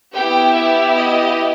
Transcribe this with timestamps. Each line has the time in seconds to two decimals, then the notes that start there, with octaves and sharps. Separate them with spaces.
0.14 B3 E4 G4 G5
0.55 E5
0.96 D#5